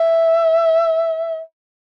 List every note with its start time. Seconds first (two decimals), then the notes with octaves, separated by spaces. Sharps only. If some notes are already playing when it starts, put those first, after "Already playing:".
Already playing: E5